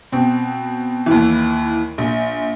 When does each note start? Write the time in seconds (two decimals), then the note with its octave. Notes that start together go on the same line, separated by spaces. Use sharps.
0.12 B2 C4
1.06 D#2 E3
1.98 A#1